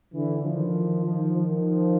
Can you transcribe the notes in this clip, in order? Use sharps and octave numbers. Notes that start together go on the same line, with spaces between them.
D3 E3
D#3 F3
D#3 F3
D#3 F3